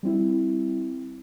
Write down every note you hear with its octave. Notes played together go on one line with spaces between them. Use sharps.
G3 C4 E4